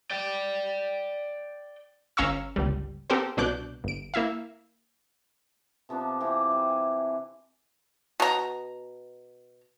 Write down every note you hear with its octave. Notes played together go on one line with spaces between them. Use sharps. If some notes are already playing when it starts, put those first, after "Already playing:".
D5 G5
G1 C#4 F5 A#5 C#6 E6
G1 C#2 G3
B3 C4 G4 A4 A#4 C5
C2 B2 D4 D6 F#6 G6
G1 D7
A#3 E4 E5 F5
C3 F3 B3 D4
E3 C4 G4
G3
G#5
B2 A#5